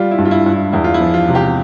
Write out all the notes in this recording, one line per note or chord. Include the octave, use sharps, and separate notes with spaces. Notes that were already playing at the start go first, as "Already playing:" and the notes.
Already playing: G3 F4
E4
G2
F4
E4
G2
E4
E2 E4
F4
E4
F3
F4
C3
G4